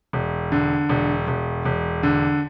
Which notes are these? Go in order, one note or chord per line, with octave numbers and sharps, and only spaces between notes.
E1
D3
E1
E1
E1
D3